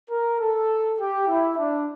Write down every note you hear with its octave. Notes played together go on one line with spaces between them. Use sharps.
A#4
A4
G4
E4
D4